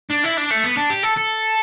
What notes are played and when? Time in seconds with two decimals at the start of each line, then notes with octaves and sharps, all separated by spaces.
0.10 D4
0.24 E4
0.37 D4
0.51 A3
0.64 B3
0.77 D4
0.90 G4
1.03 A4
1.17 A4